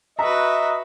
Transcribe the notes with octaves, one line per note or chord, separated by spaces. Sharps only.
F#4 B4 D#5 E5 A#5